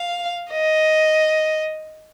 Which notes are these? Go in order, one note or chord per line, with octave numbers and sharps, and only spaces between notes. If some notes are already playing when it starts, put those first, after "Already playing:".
Already playing: F5
D#5